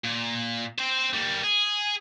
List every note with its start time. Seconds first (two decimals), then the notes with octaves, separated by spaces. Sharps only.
0.04 A#2
0.78 C4 C5
1.13 G3 A#3
1.43 G#4